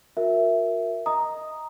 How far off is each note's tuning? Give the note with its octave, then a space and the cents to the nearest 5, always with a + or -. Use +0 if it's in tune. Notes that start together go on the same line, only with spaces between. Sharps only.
F#4 -40 A#4 +0 E5 +0
D#5 +0 A#5 +0 D#6 +0